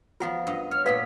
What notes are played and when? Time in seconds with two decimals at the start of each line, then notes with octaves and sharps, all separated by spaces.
0.20 F3 B3 F4 A#4 F#5
0.47 G2 B4 D#5
0.71 C#5 F6
0.86 A#2 A3 B3 B4 D5 F5 B6